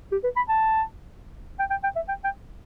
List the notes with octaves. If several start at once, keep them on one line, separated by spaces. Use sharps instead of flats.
G4
B4
B5
A5
G5
G5
G5
E5
G5
G5